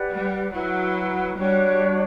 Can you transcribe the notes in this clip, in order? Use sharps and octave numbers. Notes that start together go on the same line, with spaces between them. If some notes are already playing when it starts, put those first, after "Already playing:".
Already playing: G4 B4 D5 F#5
G3
F#3 E4 B4 F#5
G3 D4 F#4 C#5